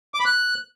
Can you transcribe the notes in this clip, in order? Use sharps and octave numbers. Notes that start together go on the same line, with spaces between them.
D6
B5
F#6